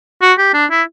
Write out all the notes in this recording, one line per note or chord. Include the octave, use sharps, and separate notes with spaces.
F#4
G4
D4
E4